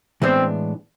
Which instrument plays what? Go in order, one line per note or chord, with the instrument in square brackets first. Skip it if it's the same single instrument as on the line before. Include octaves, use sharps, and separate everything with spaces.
[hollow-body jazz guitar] A2 E3 G#3 B3 D4 [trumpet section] C4